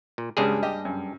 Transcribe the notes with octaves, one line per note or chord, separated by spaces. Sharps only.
A#2
C#2 G2 G3 G#3 G#4
G4 D#5
F#2